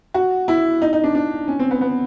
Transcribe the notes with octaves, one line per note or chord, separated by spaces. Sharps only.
F#4
E4
D#4
D#4
D4
D4
C#4
C4
B3
B3